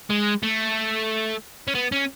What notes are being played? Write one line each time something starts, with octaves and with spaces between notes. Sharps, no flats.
G#3
A3
C#4
B3
C#4